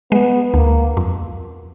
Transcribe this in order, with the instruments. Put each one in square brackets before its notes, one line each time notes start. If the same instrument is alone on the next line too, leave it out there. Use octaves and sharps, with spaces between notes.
[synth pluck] G#3 [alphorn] B3
[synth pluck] D2 [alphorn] A#3
[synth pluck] F2